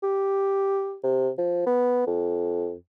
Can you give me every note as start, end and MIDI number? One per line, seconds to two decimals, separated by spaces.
0.03 0.96 67
1.03 1.29 48
1.38 1.63 53
1.66 2.02 59
2.07 2.74 41